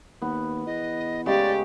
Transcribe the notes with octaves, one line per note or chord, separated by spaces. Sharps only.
D#2 B3
E2 D#5
C#3 G#3 A3 G4 D5